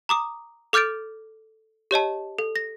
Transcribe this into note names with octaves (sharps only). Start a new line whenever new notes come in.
A#5 D6 D#6
A4 D6 F6 G6 A6 D7
G4 C#5 D#5 A5
A4
A#6